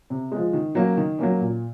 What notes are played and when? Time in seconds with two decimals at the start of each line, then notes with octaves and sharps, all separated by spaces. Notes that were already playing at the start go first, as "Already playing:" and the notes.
0.10 C3
0.32 F3 G#3
0.53 D#3
0.75 F#3 A#3 C#4
0.97 D#3
1.19 F#3 A#3 C#4
1.41 A#2